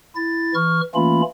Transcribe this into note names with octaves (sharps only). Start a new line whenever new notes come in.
E4 A6
E3 C#6 F6
E3 A3 A#3 C#4 F4 B5